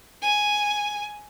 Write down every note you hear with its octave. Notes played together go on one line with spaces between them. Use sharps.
G#5